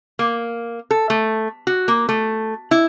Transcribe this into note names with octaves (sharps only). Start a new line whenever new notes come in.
A#3
A4
A3
F#4
A#3
A3
E4